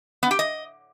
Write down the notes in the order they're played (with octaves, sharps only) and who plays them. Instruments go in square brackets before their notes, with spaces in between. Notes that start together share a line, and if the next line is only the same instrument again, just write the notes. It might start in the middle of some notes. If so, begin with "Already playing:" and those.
[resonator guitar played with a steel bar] B3
G4
D#5